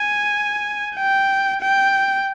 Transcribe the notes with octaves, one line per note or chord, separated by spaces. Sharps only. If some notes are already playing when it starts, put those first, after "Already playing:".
Already playing: G#5
G5
G5